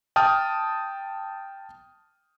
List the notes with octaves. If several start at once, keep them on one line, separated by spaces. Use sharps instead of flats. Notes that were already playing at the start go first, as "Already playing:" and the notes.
G5 A5 D#6 F6